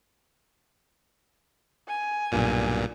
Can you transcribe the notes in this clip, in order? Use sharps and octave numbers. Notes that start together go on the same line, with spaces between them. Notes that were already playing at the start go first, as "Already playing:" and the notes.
G#5
B1 G2 A#2